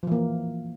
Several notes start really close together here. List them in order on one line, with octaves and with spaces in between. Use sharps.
F3 E3 A#3